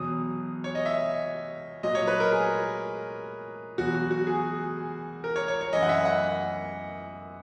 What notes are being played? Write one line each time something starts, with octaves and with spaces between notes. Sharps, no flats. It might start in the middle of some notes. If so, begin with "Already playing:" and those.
Already playing: E2 B2 F#3 D#6
C#5
D#5
E5
A#2 F#3 D#5
C#5
B4
A#4
G#4
E2 B2 F#3 F#4
F#4
F#4
G#4
A#4
C#5
C#5
C#5
F#2 E3 D#5
F#5
E5
F#5